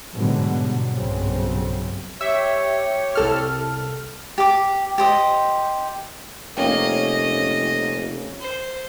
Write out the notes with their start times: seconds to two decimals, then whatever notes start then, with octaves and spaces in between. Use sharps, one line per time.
0.16 G#2 B2 D3 F#3 G3
0.93 B1 G2 C#3 F#3 C4
2.21 G4 C#5 E5
3.15 C2 A4 F6
4.38 G4 D6
4.98 G4 C5 D#5
6.57 F1 A#3 C#4 D#5 G5
8.40 C5